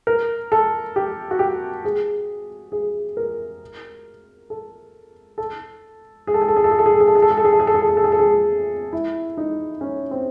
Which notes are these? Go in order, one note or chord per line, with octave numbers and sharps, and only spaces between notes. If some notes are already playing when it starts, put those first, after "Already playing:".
A#4
A4
G4
F#4
G4
G#4
G#4
A#4
A4
A4
G#4
A4
G#4
A4
G#4
A4
G#4
A4
G#4
A4
G#4
A4
G#4
A4
G#4
A4
G#4
A4
G#4
A4
G#4
A4
G#4
A4
G#4
A4
G#4
E4
D#4
C#4
C4